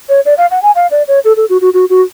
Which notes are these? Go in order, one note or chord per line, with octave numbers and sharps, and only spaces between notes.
C#5
D5
F5
F#5
G#5
F5
D5
C#5
A4
A4
F#4
F#4
F#4
F#4